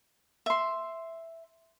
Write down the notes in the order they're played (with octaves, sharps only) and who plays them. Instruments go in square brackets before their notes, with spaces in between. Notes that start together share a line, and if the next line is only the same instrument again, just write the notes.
[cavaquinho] E5 C6